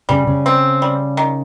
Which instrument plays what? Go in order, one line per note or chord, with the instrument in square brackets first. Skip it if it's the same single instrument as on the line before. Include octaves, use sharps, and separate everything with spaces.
[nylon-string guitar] C#3 [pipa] G3
[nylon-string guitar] C#3
[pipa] C4
G3
D#3